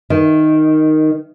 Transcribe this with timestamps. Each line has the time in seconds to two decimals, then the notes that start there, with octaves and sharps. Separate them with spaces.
0.10 D#3